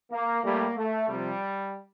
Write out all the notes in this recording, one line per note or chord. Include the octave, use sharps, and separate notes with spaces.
A#3
A2 G3 A#3
A3
C3 F3 G3